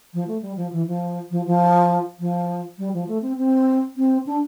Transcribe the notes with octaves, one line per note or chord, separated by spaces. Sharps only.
F3
A3
G3
F3
E3
F3
F3
F3
F3
G3
F3
A3
C4
C4
C4
D4